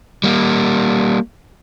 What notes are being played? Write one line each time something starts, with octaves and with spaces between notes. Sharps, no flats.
G3 A#3